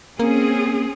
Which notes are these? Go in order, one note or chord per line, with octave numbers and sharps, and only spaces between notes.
A#3 C4 C#4 G#4